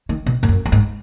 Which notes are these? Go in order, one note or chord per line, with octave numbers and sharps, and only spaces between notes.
D#3
B2
G#2
F#2
F#2
G#2